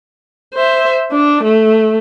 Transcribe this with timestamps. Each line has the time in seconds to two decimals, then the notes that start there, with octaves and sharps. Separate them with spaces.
0.54 C5 E5
1.11 D4
1.44 A3